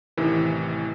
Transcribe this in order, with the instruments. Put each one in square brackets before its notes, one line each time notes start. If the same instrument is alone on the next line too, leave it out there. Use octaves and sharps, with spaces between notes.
[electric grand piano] A1 A2 C3 D#3 E3